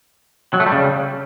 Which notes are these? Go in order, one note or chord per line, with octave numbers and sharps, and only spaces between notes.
F#3
A3
G3
C#3